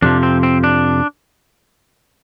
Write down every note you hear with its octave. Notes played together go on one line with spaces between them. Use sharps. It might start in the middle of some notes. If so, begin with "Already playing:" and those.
F2 C3 F3 D4
C4
C4
D4